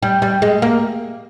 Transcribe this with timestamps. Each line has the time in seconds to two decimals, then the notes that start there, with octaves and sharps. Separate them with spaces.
0.02 G3
0.22 G3
0.42 G#3
0.62 A#3